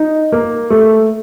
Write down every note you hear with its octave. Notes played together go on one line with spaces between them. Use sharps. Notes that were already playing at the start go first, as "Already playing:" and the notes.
Already playing: D#4
A#3
A3